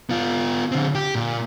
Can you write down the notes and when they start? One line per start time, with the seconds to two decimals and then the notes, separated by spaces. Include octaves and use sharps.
0.10 B3 F4
0.72 D3 C4
0.95 G4
1.15 A#2